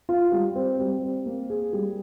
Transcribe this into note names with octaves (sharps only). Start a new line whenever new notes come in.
F4
G3
C4
G3
C4
A#3
G#4
G3